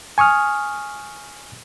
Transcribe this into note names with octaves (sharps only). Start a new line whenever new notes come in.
G#5 C#6 D#6 F6